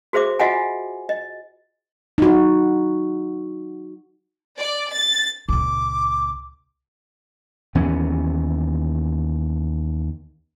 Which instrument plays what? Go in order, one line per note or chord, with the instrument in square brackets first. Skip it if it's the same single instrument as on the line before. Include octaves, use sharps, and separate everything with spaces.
[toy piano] F#4 G#4 C5 E5 D6
F4 F#4 D#5 E5 F#5 G#5
D#5
[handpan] D#4 F#4
[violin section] D5
A6
[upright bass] C#2 A#2 [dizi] D6
[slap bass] D#2 E3 B3 C#4